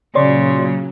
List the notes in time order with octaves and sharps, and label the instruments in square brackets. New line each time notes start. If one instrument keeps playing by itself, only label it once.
[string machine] A#2 F#3 [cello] C#3 [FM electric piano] C#5 D5 C6